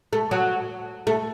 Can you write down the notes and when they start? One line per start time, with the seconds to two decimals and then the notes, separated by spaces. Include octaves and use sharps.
0.13 A3
0.31 F#3
1.07 A3